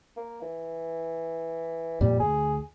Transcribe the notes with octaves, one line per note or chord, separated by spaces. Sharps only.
A#3
E3
F2 A#2 G3 A#3
D2 G#4